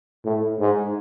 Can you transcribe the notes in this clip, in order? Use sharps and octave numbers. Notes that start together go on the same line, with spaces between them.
A2
G#2